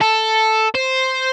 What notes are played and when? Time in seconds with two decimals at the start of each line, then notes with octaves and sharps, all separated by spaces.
0.01 A4
0.75 C5